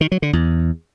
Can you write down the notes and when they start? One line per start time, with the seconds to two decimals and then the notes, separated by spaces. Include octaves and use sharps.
0.01 D#3
0.12 F#3
0.22 D3
0.33 E2